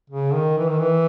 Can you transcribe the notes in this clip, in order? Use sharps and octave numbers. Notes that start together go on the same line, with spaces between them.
C#3
D#3
E3
D#3
E3